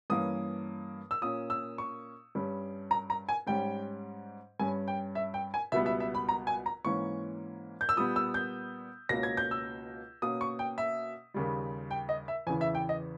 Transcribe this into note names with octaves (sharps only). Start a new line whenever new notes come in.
G2 E3 A#3 C#4 D#6
E6
A#2 A#3 C#4 D#6
E6
C#6
G2 G3 C#4
A#5
A#5
G#5
G#2 G3 C#4 G5
G2 G3 C#4 G#5
G5
E5
G5
G#5
C#2 B2 G3 B3 E5
E5
E5
B5
A#5
G#5
A#5
G#2 E3 A#3 C#4 C#6
G6
E6
A#2 G3 B3 D#6
E6
G6
C#2 B2 A#3 C#4 A#6
G#6
G6
E6
B2 A#3 C#4 D#6
C#6
G5
E5
D#2 C#3 G3
G5
D#5
E5
E2 C#3 E3 G#5
E5
G5
D#5